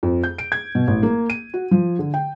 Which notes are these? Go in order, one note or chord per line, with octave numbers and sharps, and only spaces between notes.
F2
G6
D7
G#6
B2
A1
A#3
D#7
F#4
F3
D3
G5